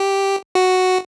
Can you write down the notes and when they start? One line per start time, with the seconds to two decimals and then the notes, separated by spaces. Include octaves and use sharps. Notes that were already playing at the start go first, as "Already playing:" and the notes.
Already playing: G4
0.55 F#4